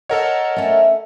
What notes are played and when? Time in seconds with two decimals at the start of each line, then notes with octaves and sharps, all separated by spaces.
0.09 A4 A#4 C#5 D#5 F#5
0.56 A3 C#4